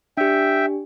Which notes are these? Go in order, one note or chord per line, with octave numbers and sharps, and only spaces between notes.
D4 G4 E5 G5